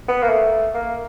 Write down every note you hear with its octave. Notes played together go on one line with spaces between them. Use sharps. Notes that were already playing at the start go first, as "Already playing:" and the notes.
B3
A#3
A3
A#3